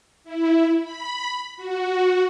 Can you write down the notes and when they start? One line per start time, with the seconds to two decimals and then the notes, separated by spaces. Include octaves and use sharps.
0.24 E4
0.83 B5
1.57 F#4